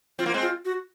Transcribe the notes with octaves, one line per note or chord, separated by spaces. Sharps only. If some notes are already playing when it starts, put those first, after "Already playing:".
C4 F4
A#3
G#3 C4
F4
F#4